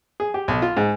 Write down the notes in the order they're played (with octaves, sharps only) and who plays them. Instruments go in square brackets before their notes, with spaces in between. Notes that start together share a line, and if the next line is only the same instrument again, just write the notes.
[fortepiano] G#4
G4
B1
F4
G#2